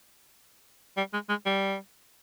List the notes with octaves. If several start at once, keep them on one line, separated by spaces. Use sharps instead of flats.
G3
G#3
G#3
G3